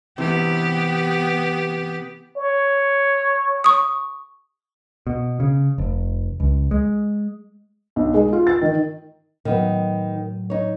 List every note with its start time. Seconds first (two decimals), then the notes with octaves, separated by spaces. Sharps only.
0.18 C3 E3 B3 G4
2.38 C#5
3.64 C#6 D#6
5.07 B2
5.40 C#3
5.78 F1
6.40 C#2
6.71 G#3
7.96 B1
8.14 G#3
8.33 F4
8.47 A6
8.61 D#3
9.45 A2 D#3 F#3 B3
10.50 D#4 C#5